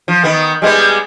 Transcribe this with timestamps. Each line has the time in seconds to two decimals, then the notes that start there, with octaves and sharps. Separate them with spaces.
0.08 F3
0.24 D#3 B3
0.62 G3 G#3 B3